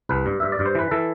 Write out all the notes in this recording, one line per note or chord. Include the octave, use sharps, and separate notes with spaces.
C2 B4
G2
G2 E5
D5
G2
C5
E3 B4
E3 A4